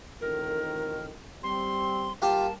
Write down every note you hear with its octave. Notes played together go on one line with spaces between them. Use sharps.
A1 F2 D#3 A#4
G3 C4 C6
G3 A#3 F4 G4 A#4 A5